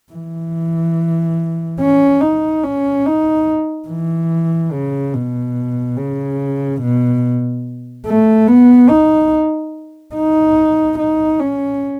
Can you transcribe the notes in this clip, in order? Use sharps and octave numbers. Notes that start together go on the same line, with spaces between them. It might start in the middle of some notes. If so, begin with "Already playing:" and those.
E3
C#4
D#4
C#4
D#4
E3
C#3
B2
C#3
B2
A3
B3
D#4
D#4
D#4
C#4